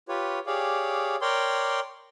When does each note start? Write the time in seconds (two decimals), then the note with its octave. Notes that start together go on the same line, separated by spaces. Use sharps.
0.09 F4 G4 B4 C#5
0.46 G4 G#4 C#5 D5 F5
1.21 A#4 C#5 D5 G5 C6